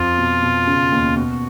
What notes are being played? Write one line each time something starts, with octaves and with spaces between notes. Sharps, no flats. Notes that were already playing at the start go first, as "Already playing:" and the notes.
Already playing: F2 F4
B2
B2
C#3
D#2
B2 F#4